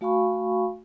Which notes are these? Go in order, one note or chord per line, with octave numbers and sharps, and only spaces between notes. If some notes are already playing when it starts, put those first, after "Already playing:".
A3 F#4 F5 G#5 B5 C#6